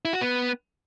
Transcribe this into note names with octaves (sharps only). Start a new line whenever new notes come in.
E4
F#4
B3